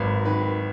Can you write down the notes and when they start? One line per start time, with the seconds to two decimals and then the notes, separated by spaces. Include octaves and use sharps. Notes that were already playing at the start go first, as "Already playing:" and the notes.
Already playing: G#1 F#3 B4
0.25 D#3 B4